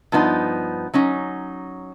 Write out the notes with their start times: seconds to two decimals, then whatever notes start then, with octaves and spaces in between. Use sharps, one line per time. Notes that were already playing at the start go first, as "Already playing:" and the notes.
0.12 G2 F3 B3 D#4
0.94 F#3 C#4 D#4